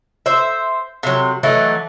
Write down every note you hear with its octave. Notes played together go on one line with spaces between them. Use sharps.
C5 E5
C3 F#3
E3 F#3 A3 D#4